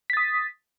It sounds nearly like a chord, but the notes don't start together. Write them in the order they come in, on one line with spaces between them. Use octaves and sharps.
B6 A6 D#6